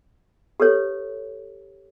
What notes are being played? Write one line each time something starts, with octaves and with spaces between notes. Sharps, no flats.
G4 A4 B4 C#5